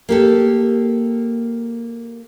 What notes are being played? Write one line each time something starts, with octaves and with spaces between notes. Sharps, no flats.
A#3 G4 A4